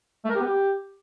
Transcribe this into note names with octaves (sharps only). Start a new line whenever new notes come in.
A3
A#4
G4
B3
G4